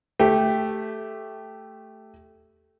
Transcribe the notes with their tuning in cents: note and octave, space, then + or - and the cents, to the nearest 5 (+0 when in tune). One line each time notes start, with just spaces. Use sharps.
A3 +0 G4 +0